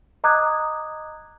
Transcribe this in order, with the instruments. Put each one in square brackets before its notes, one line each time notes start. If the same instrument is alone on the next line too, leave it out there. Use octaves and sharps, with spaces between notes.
[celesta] D#5 A#5 D6 D#6 F#6 G#6